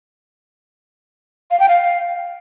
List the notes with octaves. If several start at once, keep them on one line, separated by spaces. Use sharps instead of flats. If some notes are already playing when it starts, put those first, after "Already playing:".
F5
G5
F5